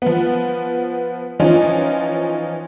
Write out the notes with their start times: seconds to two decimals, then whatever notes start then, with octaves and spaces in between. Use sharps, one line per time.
0.02 F3 B3
1.40 E3 F3 C#4 D#4 F4